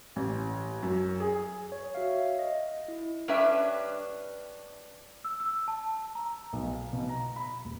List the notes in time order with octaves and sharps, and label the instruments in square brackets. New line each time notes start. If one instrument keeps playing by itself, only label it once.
[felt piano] A1
F#2
G#4
[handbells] C#5
F#4 E5 F5
D#5
E4
[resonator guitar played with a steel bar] G3 C#4 D4 B4 E5
[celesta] E6
E6
A5
A#5
[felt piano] B1
F5
B2
A#5
B5
D#1